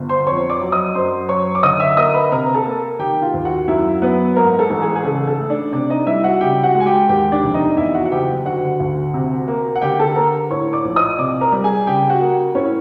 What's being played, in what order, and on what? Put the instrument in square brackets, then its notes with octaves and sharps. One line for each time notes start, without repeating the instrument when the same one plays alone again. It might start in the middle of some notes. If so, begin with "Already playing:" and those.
Already playing: [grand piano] G1
C5 C6
F2 C#5 C#6
D5 D6
F#3
D#5 D#6
F#2 C5 C6
F#3 C#5 C#6
D6
D3 D#5 D#6
E5 E6
A#3 D#5 D#6
B4 B5
C3 A#4 A#5
A4 A5
A#3
D#3 G4 G5
F4 F5
D#2
F#4 F#5
F#2 E4 E5
F#3 B3 B4
G#2 A#3 A#4
A4
A1
G#4
G#4
C#3 A4
A4
A3
D4 D5
C3 D4 D5
D#4 D#5
G3 E4 E5
F#4 F#5
C#3 G4 G5
F#4 F#5
G#3
G#5
G4 G5
D#2 G4 G5
D4 D5
F1
D#4 D#5
E2 E4 E5
F#4 F#5
F#5
F#1 G4 G5
D3 F#4 F#5
D2
C3
A#3
F#5
D3 G4 G5
A4 A5
A#3 A#4 A#5
A2 C#5 C#6
D5 D6
A#1
D#5 D#6
C3 D5 D6
A#4 A#5
G3
G#4 G#5
C#3 G4 G5
F#4 F#5
A#3
A2 C#4 C#5